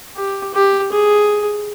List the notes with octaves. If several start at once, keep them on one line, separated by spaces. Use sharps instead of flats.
G4
G4
G#4